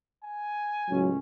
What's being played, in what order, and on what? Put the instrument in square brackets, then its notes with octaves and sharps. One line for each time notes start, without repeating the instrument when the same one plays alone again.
[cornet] G#5
[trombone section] C#2 A2 C#4 [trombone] F#3